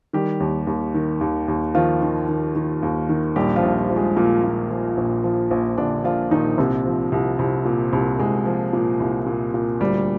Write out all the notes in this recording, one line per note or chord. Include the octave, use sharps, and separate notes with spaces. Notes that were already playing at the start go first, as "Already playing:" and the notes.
D#3 G3 G4
D#2
D#2
D#3
D#2
D#2
D#3 F3 F4
D#3
D#3
D#3
D#2
D#3
A#1 G3 G4
F3 F4
A#1
G3
F3
G#3
A#2 F3 A#3
A#2
F3
A#1
F3
A#1
A#1 D3 D4
A#2 F3 F4
A#1 D#3 D#4
C2 C3 C4
F3
C2
C2
A#2
C2
C2 G#3
F3
A#2
C2
A#2
A#2
D2 G3